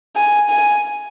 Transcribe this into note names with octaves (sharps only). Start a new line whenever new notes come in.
G#5
G#5